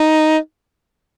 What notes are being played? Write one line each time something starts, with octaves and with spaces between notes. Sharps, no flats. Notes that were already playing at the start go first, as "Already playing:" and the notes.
Already playing: D#4